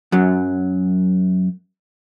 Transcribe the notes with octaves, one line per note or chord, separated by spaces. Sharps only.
F#2 F#3